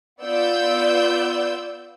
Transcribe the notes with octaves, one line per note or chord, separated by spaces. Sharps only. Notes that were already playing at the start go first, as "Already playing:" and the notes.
B3 F4 D5 E6 G6